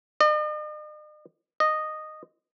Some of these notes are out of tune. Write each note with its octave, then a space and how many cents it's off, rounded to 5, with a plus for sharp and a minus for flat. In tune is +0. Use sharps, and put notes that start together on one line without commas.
D#5 -45
D#5 -10